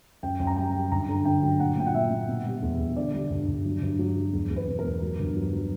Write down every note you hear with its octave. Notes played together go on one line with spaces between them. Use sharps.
F#2 G5
F#2
A#5
G3 G5
G3
G2 A#5
D3
D3 G5
F#3
A#2 F#5
A#2 G5
F#5
A#2 E5
A#2
B2
G3
E2
E2
D3 D5
G3
G2
G2
F#3
G2
F#3
F#3
E2
E2
B4
B2
A#4
E2
F#3
G2
F#3
F#3